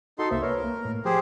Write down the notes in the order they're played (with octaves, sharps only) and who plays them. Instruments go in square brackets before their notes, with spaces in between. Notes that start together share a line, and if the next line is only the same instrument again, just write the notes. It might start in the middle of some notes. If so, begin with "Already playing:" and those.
[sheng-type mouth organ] D#4 A4 C6 [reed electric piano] F#4
[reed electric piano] C2 A#3 C5 [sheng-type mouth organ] E5
[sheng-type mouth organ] A#4 [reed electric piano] B4 C#5
[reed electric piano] A#3
A2
[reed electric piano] F3 [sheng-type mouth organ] G4 G#4 C5